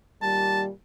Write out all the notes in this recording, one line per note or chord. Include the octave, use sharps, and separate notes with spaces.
A#2 D#3 G3 A5